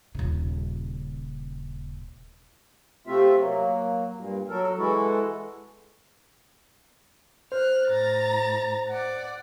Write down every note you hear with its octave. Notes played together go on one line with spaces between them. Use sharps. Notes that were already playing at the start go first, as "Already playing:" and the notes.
D#1 C#3
C3 A3 C4 F4 E5
F#3 A#3
G2 A#2
F#3 A4 A#4
E3 G#3 E4 F#4 A4
C5 F6 F#6
A2 A#5 A6
D5 F#5